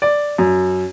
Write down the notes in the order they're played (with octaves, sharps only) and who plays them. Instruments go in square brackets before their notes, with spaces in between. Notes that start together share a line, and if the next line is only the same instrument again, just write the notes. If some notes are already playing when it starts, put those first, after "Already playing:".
[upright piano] D5
F#2